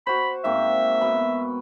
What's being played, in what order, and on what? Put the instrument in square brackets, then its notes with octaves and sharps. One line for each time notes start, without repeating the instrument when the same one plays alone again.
[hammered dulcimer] F#4 C5 [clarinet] B5
[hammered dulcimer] G#2 A#3 C4 [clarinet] E5
[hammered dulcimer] B2 B5